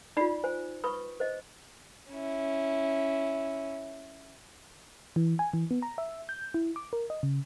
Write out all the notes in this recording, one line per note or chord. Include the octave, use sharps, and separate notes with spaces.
D#4 F4 D5 B5 C7
C5 G#5
B4 B5 C#6 D#6
C5 D#5
C#4 E4
E3
G#5
E3
B3
A#5
E5
G6
E4
D6
A#4
D#5
C#3